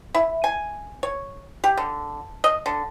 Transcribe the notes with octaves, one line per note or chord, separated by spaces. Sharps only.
E4
G#5
C#5
G4
D3
D#5
D3